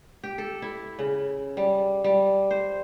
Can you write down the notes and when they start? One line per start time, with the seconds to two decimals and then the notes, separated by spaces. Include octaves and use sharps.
0.24 G4
0.38 A4
0.62 E4
0.99 C#3
1.57 G3
2.04 G3
2.51 C5